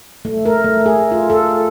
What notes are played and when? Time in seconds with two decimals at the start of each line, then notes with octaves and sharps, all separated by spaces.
0.25 A3
0.46 A#4
0.64 A3
0.86 G#4
1.12 F4
1.30 A4